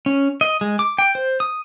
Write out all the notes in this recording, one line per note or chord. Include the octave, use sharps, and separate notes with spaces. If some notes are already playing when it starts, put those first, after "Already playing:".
C#4
D#5
G#3
D6
G5
C5
D#6